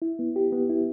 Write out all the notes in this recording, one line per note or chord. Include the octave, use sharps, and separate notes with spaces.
E4
B3
G4
B3
E4